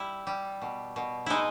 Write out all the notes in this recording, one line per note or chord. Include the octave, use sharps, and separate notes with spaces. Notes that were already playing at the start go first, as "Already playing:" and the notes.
Already playing: G3 E4
G3
B2
B2
G#3 D#4 E4